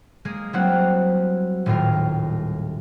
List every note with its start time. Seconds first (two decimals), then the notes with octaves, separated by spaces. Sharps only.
0.25 G#3 A#3 G#4
0.53 F#3 G3 A#3 C4 E4 F#5
1.66 D#1 A2 G3 F4 A#4